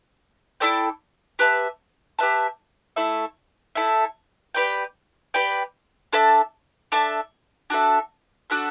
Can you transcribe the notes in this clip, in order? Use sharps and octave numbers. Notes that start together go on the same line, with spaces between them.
E4 A4 D5 G5
G4 B4 E5 A5
G4 B4 E5 A5
A3 E4 A4 E5
A3 E4 A4 E5
G4 B4 D5 G5
G4 B4 D5 G5
D4 A4 E5 A5
D4 A4 E5 A5
D4 F#4 A4 E5
D4 F#4 A4 E5